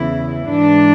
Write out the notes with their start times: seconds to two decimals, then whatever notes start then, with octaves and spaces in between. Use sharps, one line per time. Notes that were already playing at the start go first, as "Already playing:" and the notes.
Already playing: E2 C#3 E3 E4
0.49 G#2 E3 D4